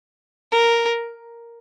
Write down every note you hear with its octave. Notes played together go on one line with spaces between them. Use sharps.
A#4